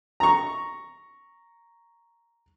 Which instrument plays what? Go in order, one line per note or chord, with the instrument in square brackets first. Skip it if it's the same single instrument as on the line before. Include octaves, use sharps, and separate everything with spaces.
[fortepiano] A#5 C#6